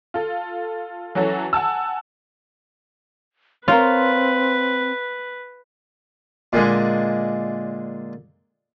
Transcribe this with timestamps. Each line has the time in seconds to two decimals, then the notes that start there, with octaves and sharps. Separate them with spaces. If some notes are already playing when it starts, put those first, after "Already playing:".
0.14 F4 A4
1.15 E3 F#3 C#4 F#4 A4
1.53 F#5 G#5 A5 E6
3.68 C4 F4 A#4 B4 C#5
6.53 A#2 D3 G#3